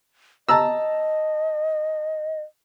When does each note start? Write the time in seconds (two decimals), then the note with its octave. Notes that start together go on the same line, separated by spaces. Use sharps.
0.49 D#5 A5 A#5 E6